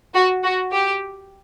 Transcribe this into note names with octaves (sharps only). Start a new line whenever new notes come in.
F#4
F#4
G4